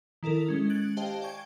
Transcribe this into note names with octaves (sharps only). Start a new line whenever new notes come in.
D#3 E4 A4 A#4
G#3 C#4
F#6 G#6 A6 D7 F#7
G4 C5 D#5 F5 G5 A5
D5 G5 G#5 C#6 G#6 D7